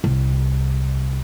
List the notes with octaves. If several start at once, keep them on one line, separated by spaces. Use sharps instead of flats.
C2